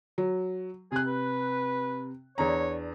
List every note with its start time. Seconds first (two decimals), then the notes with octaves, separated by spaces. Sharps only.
0.18 F#3
0.92 C3 G#4 F#6
1.06 B4
2.38 E2 D4 C#5 A#5